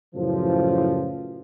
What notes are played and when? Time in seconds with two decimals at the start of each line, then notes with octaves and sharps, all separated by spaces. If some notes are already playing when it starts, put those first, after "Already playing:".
0.15 F#2 A2 C#3 E3 F3